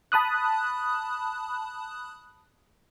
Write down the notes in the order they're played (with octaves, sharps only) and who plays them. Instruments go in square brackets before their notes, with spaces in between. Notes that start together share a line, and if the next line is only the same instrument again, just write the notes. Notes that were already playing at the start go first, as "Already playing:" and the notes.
[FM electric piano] A5 B5 D#6 F#6